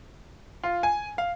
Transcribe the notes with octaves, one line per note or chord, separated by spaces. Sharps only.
F4
G#5
F5